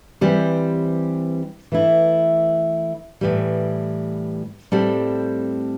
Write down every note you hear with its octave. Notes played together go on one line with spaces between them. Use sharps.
E3 G3 C4 G4 C5
E3 A3 E4
A2 E3 G3
A2 G3 C4 A4